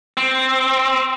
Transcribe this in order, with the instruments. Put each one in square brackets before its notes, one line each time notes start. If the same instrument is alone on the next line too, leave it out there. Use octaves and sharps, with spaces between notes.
[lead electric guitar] C4